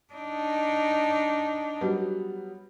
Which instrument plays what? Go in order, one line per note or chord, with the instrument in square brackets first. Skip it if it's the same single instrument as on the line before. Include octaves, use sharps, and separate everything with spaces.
[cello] D4 D#4
[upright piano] F#3 G3 B3